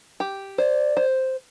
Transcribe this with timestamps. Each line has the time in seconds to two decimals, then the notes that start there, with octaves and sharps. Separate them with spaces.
0.20 G4
0.58 C5 D5
0.97 C5